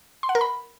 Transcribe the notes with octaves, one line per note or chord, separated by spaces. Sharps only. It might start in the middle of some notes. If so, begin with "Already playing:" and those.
C6
F#5
A#4
B5